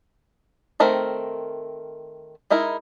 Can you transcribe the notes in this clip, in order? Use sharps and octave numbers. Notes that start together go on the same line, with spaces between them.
D#3 A3 C4 A#4
G#3 D#4 E4 A#4